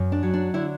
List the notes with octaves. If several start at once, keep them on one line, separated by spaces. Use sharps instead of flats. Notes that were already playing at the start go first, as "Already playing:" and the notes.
Already playing: F#2
D4
F#3
D4
D3 E4